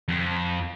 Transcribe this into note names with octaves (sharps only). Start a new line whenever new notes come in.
F2